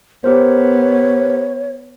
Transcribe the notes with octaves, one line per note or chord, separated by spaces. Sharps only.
B3 G4 A#4 C5 C#5